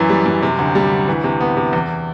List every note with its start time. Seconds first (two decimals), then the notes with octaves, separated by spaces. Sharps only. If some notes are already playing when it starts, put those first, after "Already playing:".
Already playing: F#2 E3
0.09 G3
0.26 F#2
0.42 C3
0.59 D2
0.75 G3
0.91 D2
1.08 E3
1.24 C3
1.40 B3
1.57 C3
1.73 E2